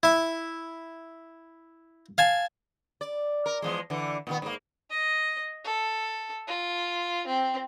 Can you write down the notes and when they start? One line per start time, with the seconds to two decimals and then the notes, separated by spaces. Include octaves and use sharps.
0.03 E4 E5
2.18 F5 G#5 A5
3.01 D5
3.46 A#4
3.62 E2 F3 G#3
3.90 D3 E3
4.27 A#2 D#3 B3
4.42 G#2 A#3
4.90 D#5
5.64 A4
6.47 F4
7.27 C4